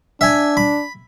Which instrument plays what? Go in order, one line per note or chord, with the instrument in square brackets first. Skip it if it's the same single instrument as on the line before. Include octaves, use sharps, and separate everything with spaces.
[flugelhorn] D4 [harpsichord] E5 G#5
[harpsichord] B5